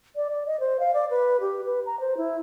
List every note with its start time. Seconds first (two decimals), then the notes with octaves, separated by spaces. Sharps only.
0.16 D5
0.30 D5
0.47 D#5
0.60 C5
0.80 F5
0.94 D5
1.10 B4
1.41 G4
1.66 B4
1.86 A#5
2.00 C5
2.17 E4